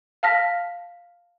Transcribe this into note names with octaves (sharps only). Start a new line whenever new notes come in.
F5 A5 F6 A#6 B6